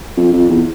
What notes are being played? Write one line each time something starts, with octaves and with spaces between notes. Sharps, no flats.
F2
F2
E2